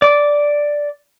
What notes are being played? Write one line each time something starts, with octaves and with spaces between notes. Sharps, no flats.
D5 D6